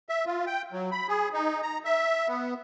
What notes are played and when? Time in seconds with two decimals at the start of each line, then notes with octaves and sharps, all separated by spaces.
0.09 E5
0.26 F4
0.47 G5
0.72 F#3
0.92 B5
1.08 G#4
1.33 D#4
1.62 A#5
1.85 E5
2.28 B3